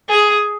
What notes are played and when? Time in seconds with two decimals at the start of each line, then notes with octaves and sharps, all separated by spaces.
0.09 G#4